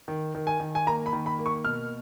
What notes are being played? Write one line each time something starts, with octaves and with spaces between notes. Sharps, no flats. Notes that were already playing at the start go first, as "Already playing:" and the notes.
D#3
D#3
G#5
D#3
G#5
A#3 A#5
B5
D#3
B5
A#3
C#6
B2 F6